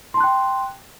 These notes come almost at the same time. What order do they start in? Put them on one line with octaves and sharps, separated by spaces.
C6 A5 F#6 G5